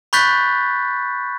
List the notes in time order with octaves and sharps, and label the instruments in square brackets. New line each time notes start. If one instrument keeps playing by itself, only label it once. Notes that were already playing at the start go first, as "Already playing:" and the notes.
[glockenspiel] B5 C#6 F#6 G6 A6 B6